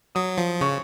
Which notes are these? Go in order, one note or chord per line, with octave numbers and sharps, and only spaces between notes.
F#3 D#6
F3
C#3 C#6